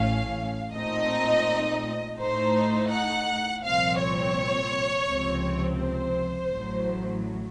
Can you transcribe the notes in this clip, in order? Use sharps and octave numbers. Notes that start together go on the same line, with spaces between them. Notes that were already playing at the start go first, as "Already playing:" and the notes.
Already playing: A1 A2 A3 C#4 F5
A#2 A3 C4 D#4 D#5
A2 A3 D#4 C5
F#5
C2 A#2 F3 C4 F5
C#5
C#2 C3 F3 C4
C5
A1 A2 F#3